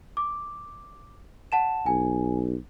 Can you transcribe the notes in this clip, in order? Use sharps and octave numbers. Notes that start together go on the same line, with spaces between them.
D6
F#5 A5 E7
B1 G#5